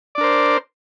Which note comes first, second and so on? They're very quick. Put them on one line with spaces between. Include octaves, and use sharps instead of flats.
D5 D4 A#4 C5